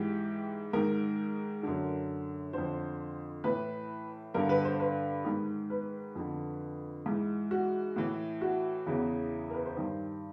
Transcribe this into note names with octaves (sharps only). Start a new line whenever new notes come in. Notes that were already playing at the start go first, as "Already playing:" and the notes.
Already playing: G#2 E3 G4
G#2 D#3 A#4
F#2 D3
F2 D3 C5
A2 E3 B4
G2 D3 A#4
B4
C5
B4
G#2 D#3
B4
F2 D3
G#2 E3
F#4
A2 E3
F#4
E2 C#3 E3
A#4
B4
C5
G2 D#3